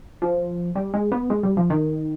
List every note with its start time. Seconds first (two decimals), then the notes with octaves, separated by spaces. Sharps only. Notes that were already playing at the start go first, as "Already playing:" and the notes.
0.22 F3
0.75 G3
0.94 G#3
1.12 B3
1.30 G#3
1.43 G3
1.57 F3
1.70 D#3